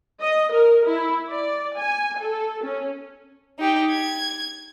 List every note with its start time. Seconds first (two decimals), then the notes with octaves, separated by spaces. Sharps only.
0.21 D#5
0.51 A#4
0.86 E4
1.29 D5
1.78 G#5
2.20 A4
2.63 C#4
3.59 D#4 G4
3.91 G#6